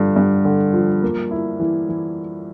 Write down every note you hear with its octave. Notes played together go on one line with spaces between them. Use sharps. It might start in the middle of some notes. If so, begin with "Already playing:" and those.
Already playing: G2 D3 F3
G2
D3
F3
A#3
E4
E3
E3